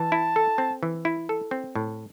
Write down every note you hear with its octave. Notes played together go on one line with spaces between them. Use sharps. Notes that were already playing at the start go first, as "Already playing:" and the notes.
Already playing: E3 A5
E4
A4
C4
E3
E4
A4
C4
A2